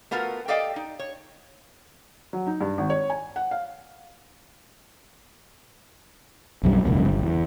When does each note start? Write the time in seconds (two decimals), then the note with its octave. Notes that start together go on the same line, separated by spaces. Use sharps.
0.11 A3 B3 F4 F#4 A#4
0.48 G4 A4 D5 D#5 F5 G5
0.76 D#4
0.99 C#5
2.33 F#3
2.47 D#4
2.61 G2
2.78 G#1
2.90 C#5
3.10 G#5
3.36 F#5
3.51 F5
6.63 B1 F#2 G3
6.84 E1 C#2 F#2 A#2
7.05 G1
7.22 E2